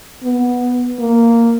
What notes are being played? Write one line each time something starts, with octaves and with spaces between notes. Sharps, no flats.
B3
A#3